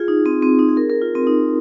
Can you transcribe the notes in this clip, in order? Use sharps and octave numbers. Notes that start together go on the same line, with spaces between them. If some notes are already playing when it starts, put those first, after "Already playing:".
Already playing: F4 G#4
D#4
C4
C4
D#4
G#4
A#4
A#4
F4
C4
D#4